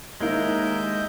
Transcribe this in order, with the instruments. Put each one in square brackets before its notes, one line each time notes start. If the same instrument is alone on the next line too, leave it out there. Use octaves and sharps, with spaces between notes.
[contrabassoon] D#2 [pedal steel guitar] G#3 A#4 [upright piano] A#3 E4 [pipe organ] D#5 E5 G6